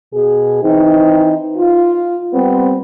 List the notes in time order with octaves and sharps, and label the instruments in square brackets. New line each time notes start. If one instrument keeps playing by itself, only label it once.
[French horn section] B2 G#4
E3 C4 D#4
F4
G3 B3 C4